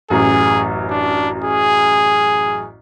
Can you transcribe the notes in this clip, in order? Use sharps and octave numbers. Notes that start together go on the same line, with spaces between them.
A1 F#2 G#4
D4
G#4